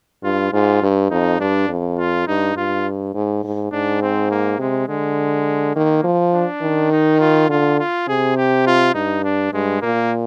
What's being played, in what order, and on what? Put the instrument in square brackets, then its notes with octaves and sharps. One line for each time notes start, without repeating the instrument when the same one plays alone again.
[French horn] G2 [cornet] F4
[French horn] G#2 [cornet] F4
[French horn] G2
[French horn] F2 [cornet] D#4
[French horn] G2 [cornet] D4
[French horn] F2
[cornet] F4
[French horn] G2 [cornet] D#4
[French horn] G2 [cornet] F4
[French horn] G#2
G#2
[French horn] G#2 [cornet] D4
[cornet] C4
A#3
[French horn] C3 [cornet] G#3
[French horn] D3 [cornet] G#3
[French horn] D#3 [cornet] A#3
[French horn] F3
[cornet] D4
[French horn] D#3
[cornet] D#4
F4
[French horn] D3 [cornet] F4
[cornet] F4
[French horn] C3 [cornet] G#4
[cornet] G4
F4
[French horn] G2 [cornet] D#4
[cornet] D4
[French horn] G2 [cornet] G#3
[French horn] A#2 [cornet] A#3